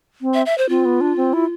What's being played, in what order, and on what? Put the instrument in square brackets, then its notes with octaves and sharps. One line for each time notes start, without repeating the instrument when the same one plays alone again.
[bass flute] C4
[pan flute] E5
E5
C5
[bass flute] C4 [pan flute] F4
[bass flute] B3
D4
C4
E4